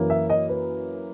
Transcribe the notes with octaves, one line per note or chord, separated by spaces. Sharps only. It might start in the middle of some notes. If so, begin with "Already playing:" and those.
Already playing: F#2 E3 A#3
E5
D#5
B4